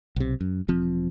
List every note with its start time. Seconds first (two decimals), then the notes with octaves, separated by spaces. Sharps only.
0.16 B1 C3
0.41 F#2
0.68 E1 F3 C4